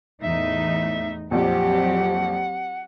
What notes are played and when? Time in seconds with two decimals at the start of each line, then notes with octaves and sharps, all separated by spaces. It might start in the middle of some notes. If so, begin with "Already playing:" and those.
0.23 E2 A2 D#4 E5
1.31 A#1 F2 F#3 C4 G4 F#5